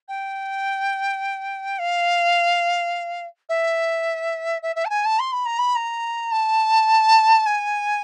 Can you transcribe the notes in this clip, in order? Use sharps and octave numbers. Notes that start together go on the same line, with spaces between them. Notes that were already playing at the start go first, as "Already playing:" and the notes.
G5
F5
E5
E5
E5
A5
G#5
A5
C6
B5
A#5
B5
A#5
A5
G#5